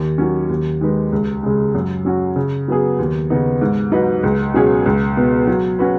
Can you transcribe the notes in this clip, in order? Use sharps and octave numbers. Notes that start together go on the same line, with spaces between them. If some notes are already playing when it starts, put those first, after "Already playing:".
Already playing: D#2
D#3 F#3 C#4
D#2
D#3 G#3 D#4 B4
C#2
C#3 G#3
F#2
F#3 C#4 F#4
C#3
F#3 B3 G#4
D#2
C#3 B3 D#4
G#2
F#3 D#4 B4 D#5
C#2
B2 F#3 C#4 G#4
C#2
B2 B3
F#3
C#4 F#4 B4